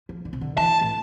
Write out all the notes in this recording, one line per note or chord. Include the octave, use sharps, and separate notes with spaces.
F3
D3
C3
D3
E3 A5
A2